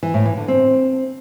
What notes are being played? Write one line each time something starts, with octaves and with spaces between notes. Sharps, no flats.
E3
A2
E3
D3
C4